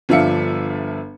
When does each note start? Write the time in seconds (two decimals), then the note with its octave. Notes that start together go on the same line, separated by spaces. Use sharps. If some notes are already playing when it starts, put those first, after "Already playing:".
0.09 G1 F3 D4 E5 F5 C#7